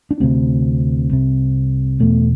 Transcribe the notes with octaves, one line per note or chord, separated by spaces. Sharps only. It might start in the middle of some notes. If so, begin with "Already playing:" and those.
D4
D2 C3 C4
C2 C3
E2 B2 A3